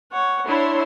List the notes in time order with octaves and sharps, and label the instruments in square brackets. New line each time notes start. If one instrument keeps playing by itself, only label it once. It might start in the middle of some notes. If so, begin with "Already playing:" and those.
[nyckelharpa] C#5 F#5
[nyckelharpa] D4 [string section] E4 C#5 C6